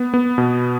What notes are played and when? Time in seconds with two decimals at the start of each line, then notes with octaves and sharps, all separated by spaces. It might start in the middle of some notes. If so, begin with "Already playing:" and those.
Already playing: B3
0.14 B3
0.38 B2